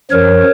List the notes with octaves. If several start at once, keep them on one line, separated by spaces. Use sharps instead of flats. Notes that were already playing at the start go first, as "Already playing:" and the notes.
F#2 F3 A#4 C#5